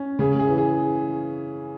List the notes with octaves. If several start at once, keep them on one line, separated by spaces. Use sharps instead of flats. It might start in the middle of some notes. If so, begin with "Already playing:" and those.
Already playing: C#4
C#3 G#4
G#4
E3
G#4